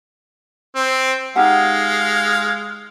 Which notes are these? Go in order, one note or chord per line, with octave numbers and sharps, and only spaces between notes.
C4
G#3 D#4 G4 F5 F#5